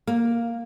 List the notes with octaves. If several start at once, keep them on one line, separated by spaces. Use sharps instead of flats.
A#3